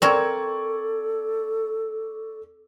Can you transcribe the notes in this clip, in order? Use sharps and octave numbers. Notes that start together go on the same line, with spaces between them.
C4 A4 A#4 D5 C#6 G#6